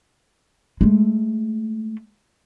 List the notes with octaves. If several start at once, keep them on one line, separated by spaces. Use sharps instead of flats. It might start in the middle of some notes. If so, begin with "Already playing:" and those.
G#3 A3